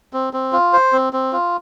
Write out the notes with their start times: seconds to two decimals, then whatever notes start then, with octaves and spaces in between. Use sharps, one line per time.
0.13 C4
0.33 C4
0.53 F4
0.73 C5
0.93 C4
1.13 C4
1.33 F4